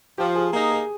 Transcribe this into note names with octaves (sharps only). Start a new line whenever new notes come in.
F3 G4
G#4
A#3 D#4 G#4
G#4